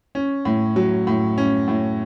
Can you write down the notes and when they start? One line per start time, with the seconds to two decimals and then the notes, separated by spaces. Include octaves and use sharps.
0.15 C#4
0.45 A2
0.76 F#3
1.07 A2
1.38 C#4
1.68 A2